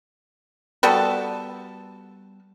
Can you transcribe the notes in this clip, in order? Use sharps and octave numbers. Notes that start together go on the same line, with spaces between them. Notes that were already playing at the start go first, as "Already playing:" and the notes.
G3 B3 F#4 A4